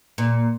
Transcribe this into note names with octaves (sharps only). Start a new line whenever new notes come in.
A#2